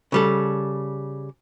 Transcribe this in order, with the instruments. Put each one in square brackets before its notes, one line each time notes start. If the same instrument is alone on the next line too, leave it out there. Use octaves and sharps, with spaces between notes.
[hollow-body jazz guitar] C#3 G3 A4